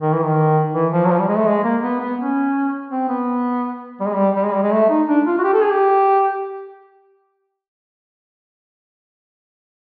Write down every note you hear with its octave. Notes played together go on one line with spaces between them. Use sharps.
D#3
E3
D#3
E3
F3
F#3
F3
G3
G#3
A3
G#3
A#3
B3
B3
C#4
C4
B3
G3
G#3
G3
G3
G#3
G3
G#3
A3
D#4
D4
F4
F#4
G4
A4
G#4
G4